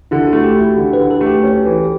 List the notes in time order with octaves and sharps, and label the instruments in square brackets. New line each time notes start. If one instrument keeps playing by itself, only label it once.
[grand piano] D3 [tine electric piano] E4
[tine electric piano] F#4
[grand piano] A3
[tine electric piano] G4
[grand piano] E4
[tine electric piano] F#4
[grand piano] D3
[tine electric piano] B4
[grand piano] D3
[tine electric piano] A4
[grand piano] A3
[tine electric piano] G4
[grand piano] C#4
E3